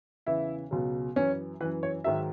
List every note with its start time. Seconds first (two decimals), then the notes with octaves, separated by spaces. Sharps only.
0.26 E2 C#3 E3 E4
0.71 C#2 B2 F#3
1.16 F#2 E3 C#4
1.61 F#2 E3 B4
1.83 C#5
2.04 G#2 D#3 F#3 E5